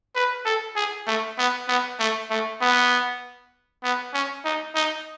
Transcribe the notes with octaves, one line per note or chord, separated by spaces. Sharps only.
B4
A4
G#4
A3
B3
B3
A3
A3
B3
B3
C#4
D#4
D#4